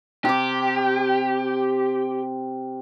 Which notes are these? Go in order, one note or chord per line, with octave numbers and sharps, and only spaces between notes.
C3 G4 D6